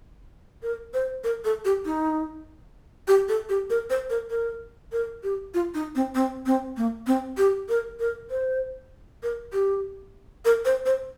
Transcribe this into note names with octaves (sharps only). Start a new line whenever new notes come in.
A#4
C5
A#4
A4
G4
D#4
G4
A4
G4
A#4
C5
A#4
A#4
A#4
G4
F4
D#4
C4
C4
C4
A#3
C4
G4
A#4
A#4
C5
A#4
G4
A#4
C5
C5